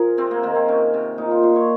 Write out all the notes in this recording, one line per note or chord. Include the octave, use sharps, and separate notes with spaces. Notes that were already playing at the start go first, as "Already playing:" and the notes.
Already playing: F3 G#4 A#4
C3 C4
A#3
D#3 A#3
C4
C3 C#4
C3
A#2 D#4
F4
A#2 C5
C#5